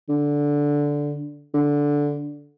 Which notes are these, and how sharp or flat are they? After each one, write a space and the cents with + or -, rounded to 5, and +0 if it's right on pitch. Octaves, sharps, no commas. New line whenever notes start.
D3 -10
D3 -10